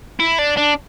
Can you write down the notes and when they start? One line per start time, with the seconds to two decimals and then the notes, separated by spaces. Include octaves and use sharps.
0.20 E4
0.39 D4
0.57 D4